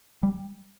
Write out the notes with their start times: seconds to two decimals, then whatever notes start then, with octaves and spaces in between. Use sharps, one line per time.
0.23 G3